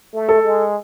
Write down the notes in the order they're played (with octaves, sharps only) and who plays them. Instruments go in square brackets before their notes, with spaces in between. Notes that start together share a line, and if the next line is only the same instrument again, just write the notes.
[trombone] A3
[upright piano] A4
[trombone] G#3